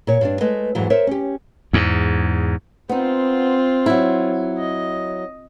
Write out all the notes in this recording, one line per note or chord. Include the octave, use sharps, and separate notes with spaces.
A#2 C#5
G2 D4
G#3 A3 B4 D#5
F2 G#2 E3 F#3
A#4 C5 C#5 E5
C#4 G4
E2 G#2
B3 C4 D#4 F4
F#3 E4
D#5